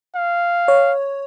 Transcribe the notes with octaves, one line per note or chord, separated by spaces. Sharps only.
F5
C#5